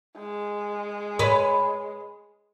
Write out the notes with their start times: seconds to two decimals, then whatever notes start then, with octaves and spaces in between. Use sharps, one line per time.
0.18 G#3
1.19 B4 C#5